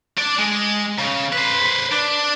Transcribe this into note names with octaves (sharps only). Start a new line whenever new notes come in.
D4 D5
G#3
C#3
B4 C5
D4